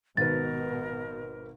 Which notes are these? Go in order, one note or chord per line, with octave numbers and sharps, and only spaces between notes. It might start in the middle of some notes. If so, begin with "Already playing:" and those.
G#1 B2 A#4 B4 A6